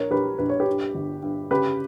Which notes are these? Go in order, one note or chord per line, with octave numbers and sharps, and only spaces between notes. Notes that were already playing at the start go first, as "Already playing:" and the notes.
Already playing: A#1 A#4 C#5
A#1 G4 B4
A#1 B4
C#5
G4 B4
G2
G1
G2
C#3 G4 B4